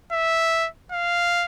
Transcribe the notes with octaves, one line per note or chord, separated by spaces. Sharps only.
E5
F5